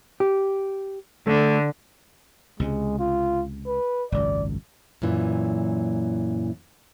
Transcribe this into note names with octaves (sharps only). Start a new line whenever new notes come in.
G4
D3 A3
C#2 C3 G#3
F4
B4
G#1 C#2 F#2 D5
F#2 A#2 E3